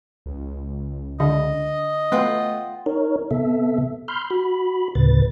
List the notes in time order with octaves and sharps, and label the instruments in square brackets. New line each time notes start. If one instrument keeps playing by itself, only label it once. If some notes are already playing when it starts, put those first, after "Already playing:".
[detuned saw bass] C#2
[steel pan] D3 [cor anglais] D#5
[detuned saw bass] A3 [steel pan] B3 [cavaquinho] F4 F#5 G5
[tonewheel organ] D#4 A#4 C#5
C3 B3 A4 E5
B5 C6 F6 G6
F#4 B5
D2 A2 C#3 B4 A6